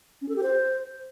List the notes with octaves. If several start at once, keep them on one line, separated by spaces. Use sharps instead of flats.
C#4
A4
G4
C5